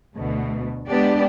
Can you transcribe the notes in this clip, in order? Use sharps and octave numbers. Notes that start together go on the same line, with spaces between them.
D2 B2 A3
G#3 B3 D4 G4 D5